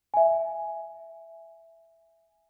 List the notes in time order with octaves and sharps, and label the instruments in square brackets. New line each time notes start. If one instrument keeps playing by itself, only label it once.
[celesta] E5 G#5